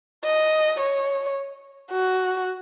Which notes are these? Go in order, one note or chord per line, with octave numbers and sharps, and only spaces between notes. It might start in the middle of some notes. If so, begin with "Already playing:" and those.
D#5
C#5
F#4